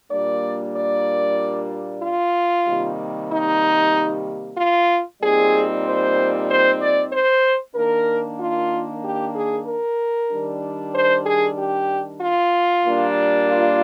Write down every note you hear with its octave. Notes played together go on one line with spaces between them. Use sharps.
A#2 G3 A#3 D4 D5
D5
F4
C3 D#3 G3 A#3
D#4
F4
A#2 G3 C4 D#4 G#4
C5
C5
D5
C5
D#3 A#3 D4 A#4
F4
G4
G#4
A#4
D#3 G3 D4
C5
G#4
G4
F4
A#2 G3 A#3 D4
F4